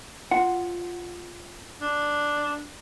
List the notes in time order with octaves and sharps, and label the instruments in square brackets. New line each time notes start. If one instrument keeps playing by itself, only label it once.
[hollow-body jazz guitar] F4 F#5
[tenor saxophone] D4